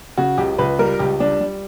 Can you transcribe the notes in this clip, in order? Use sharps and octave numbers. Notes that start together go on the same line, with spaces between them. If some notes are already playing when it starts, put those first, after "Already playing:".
C#3 F#4
C#2 G4
C#2 B4
G3 A#4
C#2 G4
G3 D4
G3